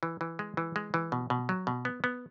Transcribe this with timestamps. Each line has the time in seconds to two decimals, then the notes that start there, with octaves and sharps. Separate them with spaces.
0.03 E3
0.21 E3
0.39 G#3
0.57 E3
0.76 G#3
0.94 E3
1.12 B2
1.30 B2
1.49 F#3
1.67 B2
1.85 B3
2.04 B3